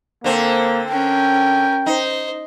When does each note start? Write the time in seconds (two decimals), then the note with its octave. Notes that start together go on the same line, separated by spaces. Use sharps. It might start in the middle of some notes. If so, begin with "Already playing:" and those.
0.24 D3 A#3 C4
0.89 C#4 A#4 G5
1.86 D#4 C5